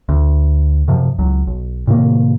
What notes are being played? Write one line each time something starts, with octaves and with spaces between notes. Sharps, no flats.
D2
F#2 C3 F3
C#2 F#3
B1
A2 C3 D#3 A#3